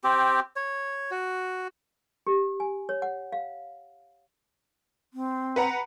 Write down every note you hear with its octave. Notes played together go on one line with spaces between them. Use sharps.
C4 G4
C#5
F#4
G4
G#5
C#5
F#5
F5
C4
B4 F#5 A#5